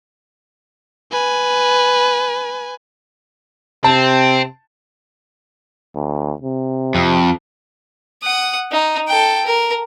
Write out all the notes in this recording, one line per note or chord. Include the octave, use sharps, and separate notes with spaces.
B4 G#5
C3 C4 A5
D2
C3
F2
F#5 D#6
D#4
A4 G5
A#4